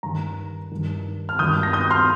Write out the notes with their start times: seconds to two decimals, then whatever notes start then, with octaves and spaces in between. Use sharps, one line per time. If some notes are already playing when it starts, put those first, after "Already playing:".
0.03 G2 D#3 A#5
0.72 G2 D#3
1.29 F6
1.39 G2 D#3 D#6 G6
1.63 A#6
1.73 D#6 G6
1.90 C6 F6